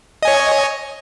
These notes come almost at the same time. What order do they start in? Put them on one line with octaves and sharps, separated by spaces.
D#5 G#5 C#5